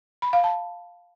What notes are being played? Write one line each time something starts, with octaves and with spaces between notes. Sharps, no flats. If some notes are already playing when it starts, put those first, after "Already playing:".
B5
F5
A5